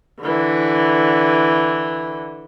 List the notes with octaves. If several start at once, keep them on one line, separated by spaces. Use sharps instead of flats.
D3 E3